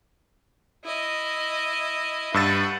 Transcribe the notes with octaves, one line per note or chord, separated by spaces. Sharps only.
E4 D#5
G2 B4 F#5 E6 A6